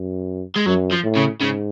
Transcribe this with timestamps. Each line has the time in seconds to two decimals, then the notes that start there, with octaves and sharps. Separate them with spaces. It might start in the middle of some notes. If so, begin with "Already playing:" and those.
Already playing: F#2
0.56 G#3
0.66 F#2 F#3
0.91 F3
1.04 A2
1.15 C#3
1.40 G#2 C#3